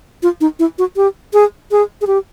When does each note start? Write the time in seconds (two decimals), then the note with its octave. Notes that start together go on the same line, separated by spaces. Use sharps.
0.23 F4
0.41 D#4
0.59 E4
0.78 F#4
0.96 G4
1.33 G#4
1.71 G#4
2.01 G#4
2.07 G4